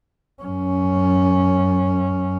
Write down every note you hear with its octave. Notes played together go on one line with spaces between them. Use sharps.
F#2 C#4